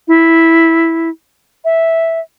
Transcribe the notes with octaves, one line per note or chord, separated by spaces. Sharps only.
E4
E5